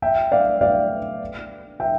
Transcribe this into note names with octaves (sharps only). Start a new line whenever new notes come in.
E5 G5
D5 F5
D5 F5
E5 G5